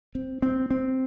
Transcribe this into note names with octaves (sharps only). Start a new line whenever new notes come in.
C4
C4
C4